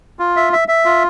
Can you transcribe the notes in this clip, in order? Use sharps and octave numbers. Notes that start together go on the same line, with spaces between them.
F4
E5
E5
E5
F4